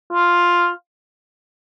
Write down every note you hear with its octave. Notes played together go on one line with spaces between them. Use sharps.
F4